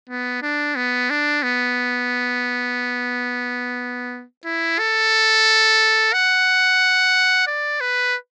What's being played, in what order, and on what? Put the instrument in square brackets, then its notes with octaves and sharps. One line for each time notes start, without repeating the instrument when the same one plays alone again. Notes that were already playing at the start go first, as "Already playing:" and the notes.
[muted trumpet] B3
D4
B3
D4
B3
E4
A4
F#5
D5
B4